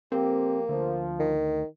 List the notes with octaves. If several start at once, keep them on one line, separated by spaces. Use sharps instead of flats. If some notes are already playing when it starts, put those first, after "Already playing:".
F2 F3 A#3 C4 G4
D2 F3
D#3